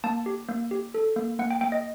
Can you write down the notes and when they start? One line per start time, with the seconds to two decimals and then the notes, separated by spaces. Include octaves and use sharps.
0.04 A#3 A5
0.26 G4
0.49 A#3
0.71 G4
0.94 A4
1.16 A#3
1.39 A#3 F#5
1.51 G5
1.61 A#3 G5
1.72 D#5